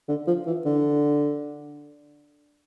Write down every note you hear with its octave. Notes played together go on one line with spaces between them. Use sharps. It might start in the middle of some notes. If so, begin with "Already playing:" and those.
D3
F3
E3
D3